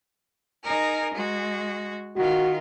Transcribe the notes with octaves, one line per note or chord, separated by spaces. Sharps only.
D#4 G#4 A#4
G#3 F#4
D#3 F4 F#4